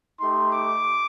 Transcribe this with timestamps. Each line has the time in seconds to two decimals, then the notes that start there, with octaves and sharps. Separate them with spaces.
0.20 A3 D#4 G4 C6
0.52 D6